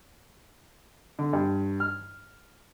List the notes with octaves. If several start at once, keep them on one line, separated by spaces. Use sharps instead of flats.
D3
G2
F6